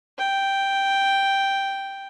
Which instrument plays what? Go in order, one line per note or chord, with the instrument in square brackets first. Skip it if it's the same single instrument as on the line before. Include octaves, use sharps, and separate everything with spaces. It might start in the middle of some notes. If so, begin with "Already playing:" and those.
[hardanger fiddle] G5